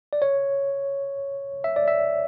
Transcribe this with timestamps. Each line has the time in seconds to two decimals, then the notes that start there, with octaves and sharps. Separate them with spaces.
0.13 D5
0.22 C#5
1.64 E5
1.76 D5
1.88 E5